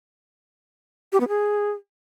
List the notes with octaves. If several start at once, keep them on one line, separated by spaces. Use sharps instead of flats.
G4
B3
G#4